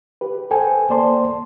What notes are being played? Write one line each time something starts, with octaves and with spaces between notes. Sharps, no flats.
G4 B4
A4 C5 G5 G#5
A#3 C5 D5 A5 C6